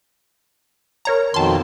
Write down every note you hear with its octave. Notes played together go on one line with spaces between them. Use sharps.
A#4 C#5 A#5
F2 B2 D#3 A5 C6